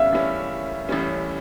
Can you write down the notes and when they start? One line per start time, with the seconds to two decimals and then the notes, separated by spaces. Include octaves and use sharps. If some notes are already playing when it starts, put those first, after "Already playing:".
Already playing: A1 A2 G3 C#4 E5 F5
0.12 A1 A2 G3 C#4
0.89 A1 A2 G3 C#4